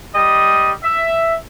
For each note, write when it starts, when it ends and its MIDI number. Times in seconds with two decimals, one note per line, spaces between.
0.14 0.71 55
0.14 0.71 75
0.82 1.35 76